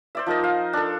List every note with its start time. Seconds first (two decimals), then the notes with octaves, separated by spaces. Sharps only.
0.15 C5 D5 E5
0.26 F3 D#4 A#4 D#5
0.44 F5
0.73 D4 A4